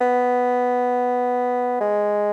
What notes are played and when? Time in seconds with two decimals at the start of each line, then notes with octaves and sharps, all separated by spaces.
0.01 B3
1.80 G#3